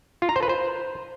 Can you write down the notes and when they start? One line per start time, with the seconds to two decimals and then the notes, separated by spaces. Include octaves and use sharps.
0.22 F4
0.29 A#5
0.36 C5
0.43 B4
0.49 C5